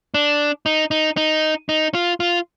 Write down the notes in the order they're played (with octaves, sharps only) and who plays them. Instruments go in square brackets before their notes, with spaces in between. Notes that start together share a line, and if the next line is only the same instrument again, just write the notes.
[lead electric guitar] D4
D#4
D#4
D#4
D#4
F4
F4